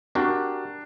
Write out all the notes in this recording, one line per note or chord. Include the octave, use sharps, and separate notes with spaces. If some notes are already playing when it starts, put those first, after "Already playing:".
D4 F#4 G4 A#4